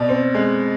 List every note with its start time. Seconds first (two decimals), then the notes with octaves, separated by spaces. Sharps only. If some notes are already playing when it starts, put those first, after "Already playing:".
Already playing: B2 D5
0.09 C4
0.34 G#3